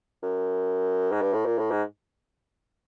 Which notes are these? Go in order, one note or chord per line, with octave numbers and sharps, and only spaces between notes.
F#2
G#2
G2
A2
A#2
A2
G#2